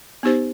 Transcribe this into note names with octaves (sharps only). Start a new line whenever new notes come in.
B3 D#4 G4 C5